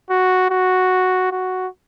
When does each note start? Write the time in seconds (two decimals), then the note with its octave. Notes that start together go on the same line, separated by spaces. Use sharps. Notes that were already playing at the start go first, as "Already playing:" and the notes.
0.10 F#4
0.50 F#4
1.31 F#4